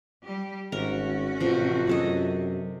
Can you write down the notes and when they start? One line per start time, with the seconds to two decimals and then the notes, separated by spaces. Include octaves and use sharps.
0.23 G3 G4
0.72 G#1 C#4 F#4 A#4
1.40 A1 C3 F3
1.87 F#2 G#4 A4 D#5